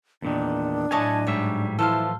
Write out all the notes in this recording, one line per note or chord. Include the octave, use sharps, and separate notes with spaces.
E2 A#2 D#3 D4
A2 F#3 E4 A4 C#5 D#5 G#5 A5
G#2 G3 C#5 E5
E3 F3 E4 A4 C5 F5